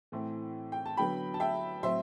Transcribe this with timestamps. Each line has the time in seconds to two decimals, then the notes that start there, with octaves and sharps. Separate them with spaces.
0.12 A2 E3 A3 C4
0.72 G5
0.86 A5
0.97 D3 F#3 B3 G5 B5
1.34 A5
1.40 E5 G5
1.83 A2 F#3 C4 C5 E5